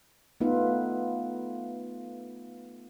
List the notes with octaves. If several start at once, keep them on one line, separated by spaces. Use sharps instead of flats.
A3 B3 D#4 F4 B4 E5